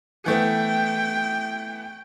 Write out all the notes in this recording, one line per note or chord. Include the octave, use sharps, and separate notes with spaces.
E3 A3 B3 G5